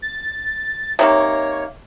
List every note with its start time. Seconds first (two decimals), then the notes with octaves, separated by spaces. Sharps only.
0.02 A6
0.99 C3 D#3 A#3 C#5